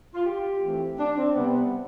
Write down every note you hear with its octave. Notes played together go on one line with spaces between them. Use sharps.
F4
G4
E3 A3 C4
D4
C4
C3 G3 B3